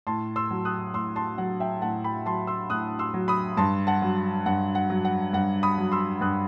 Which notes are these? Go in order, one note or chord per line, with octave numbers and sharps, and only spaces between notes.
A2 A5 C6
C6 E6
F#3
D#6 F#6
A2 C6 E6
A5 C6
F#3 F#5
E5 G5
A2 F#5 A5
G5 B5
F#3 A5 C6
C6 E6
A2 D#6 F#6
C6 E6
F#3
B5 D#6
G2 A5 C6
F#5 A5
F#3
G2 F#5
F#5
F#3
F#5
G2 F#5
B5 D#6
F#3
C6 E6
G2 D#6 F#6